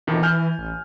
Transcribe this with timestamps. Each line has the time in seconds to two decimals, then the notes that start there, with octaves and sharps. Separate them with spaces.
0.07 F2 B2 D#3 E3
0.23 G#5 F6 G6
0.59 A1